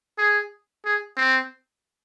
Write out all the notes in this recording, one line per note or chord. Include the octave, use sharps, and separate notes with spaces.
G#4
G#4
C4